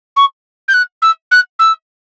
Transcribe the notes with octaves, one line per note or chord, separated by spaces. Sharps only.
C#6
G6
F#6
E6
F#6
E6